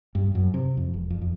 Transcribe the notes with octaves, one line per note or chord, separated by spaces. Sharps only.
G2
F#2
C3
F2
E1
F2
F2